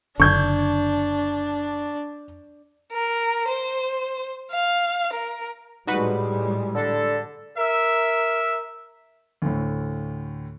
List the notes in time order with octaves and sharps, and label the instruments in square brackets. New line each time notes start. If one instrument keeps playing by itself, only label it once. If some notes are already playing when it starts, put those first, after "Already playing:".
[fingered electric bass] F#1 D3 [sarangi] D4 [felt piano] C#6 G6 G#6
[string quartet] A#4
C5
F5
A#4
[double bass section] A2 G3 G#3 [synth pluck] D#4 F#4 B4
[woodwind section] D3 A4
[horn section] A#4 E5
[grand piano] D2 A2